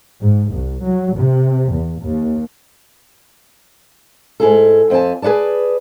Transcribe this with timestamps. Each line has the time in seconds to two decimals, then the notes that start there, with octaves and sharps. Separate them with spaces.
0.21 G#2
0.51 C2
0.84 F#3
1.18 C3
1.72 E2
2.02 D#2
4.40 G#2 E4 G#4 A4
4.90 F2 C4 E5 G#5 A5
5.22 G#4 B4 C#5 D5 A5